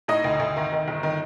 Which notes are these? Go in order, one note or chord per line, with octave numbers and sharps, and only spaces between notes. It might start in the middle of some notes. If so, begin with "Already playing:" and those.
A2 D#4 D#5
D2
D2
D#3
D#3
G1
D#3